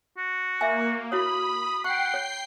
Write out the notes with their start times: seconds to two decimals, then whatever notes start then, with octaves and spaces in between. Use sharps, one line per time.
0.18 F#4
0.61 A#3 E5 G#5
1.12 E4 F#4 C#5 B5 D#6
1.84 F#5 G5 C#6 C7
2.14 C#5